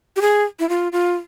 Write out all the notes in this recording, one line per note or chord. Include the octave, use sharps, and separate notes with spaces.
G4
G#4
E4
F4
F4